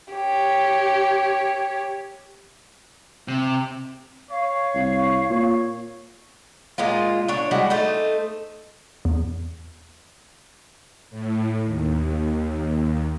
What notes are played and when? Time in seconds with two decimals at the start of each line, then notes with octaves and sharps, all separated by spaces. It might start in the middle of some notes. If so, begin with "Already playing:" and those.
0.13 G4 C#5
3.28 C3
4.31 C#5 F5
4.75 C2
5.30 A#2 C#5
6.78 A#2 G#3 D#4 F4
7.28 D4 C#5
7.51 G3 G#3 E4 F#4
7.70 A3 D#4 C5
9.05 E2
11.10 A2
11.65 D#2